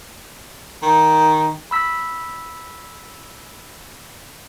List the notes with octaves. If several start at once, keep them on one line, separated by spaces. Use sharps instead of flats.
D#3
B5 E6 B6